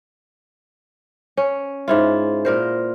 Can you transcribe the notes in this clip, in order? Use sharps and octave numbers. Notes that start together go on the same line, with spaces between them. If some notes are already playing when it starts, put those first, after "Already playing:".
C#4
G#2 E4 F4
A#2 A#4 C5